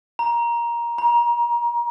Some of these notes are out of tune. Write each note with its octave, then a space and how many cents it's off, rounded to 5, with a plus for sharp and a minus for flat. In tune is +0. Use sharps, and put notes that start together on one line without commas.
A#5 +15
A#5 +30